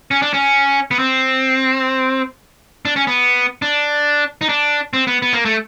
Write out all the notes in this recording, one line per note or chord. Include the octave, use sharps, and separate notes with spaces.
C#4
D4
C#4
B3
C4
D4
C#4
B3
D4
D#4
D4
C4
B3
B3
A#3
A3